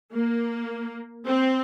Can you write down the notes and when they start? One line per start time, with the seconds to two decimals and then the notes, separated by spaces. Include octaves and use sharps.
0.14 A#3
1.26 C4